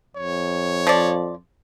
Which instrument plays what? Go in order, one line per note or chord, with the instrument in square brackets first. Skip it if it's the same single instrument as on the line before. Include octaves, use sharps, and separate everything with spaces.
[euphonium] F2 [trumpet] C#5
[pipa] F3 D5